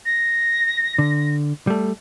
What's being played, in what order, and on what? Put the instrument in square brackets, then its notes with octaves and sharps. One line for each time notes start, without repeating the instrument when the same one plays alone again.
[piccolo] A#6
[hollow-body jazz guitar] D3
G3 A3